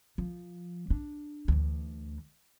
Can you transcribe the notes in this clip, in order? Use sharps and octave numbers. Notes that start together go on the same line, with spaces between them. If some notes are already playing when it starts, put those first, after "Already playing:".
F3
D4
D2 E3